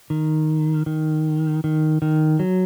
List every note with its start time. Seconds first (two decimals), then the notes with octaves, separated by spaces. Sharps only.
0.10 D#3
0.86 D#3
1.64 D#3
2.02 D#3
2.39 F#3